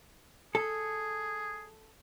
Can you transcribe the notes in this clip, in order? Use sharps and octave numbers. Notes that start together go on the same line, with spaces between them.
G#4 A4